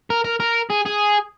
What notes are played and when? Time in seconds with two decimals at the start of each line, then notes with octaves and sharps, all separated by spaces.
0.10 A#4
0.25 A#4
0.40 A#4
0.70 G#4
0.85 G#4